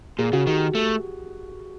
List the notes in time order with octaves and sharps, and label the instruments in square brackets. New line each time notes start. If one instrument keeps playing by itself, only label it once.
[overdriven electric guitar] A#2 [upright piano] G#4
[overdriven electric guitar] C#3 [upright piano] F#4
[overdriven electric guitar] D#3 [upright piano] G4
[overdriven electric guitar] A3